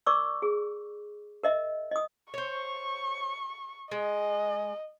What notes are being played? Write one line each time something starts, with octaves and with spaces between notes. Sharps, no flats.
A#4 D5 C#6 D6 E6
G#4
A#4 D#5 E5
D#5 D#6
C5 C#5 C#6
G#3 D#5